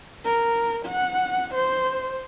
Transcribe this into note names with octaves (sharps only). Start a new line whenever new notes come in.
A#4
F#5
C5